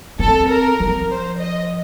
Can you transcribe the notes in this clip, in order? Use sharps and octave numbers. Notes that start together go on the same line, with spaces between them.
C4 A4
A#4
F3
C5
D#5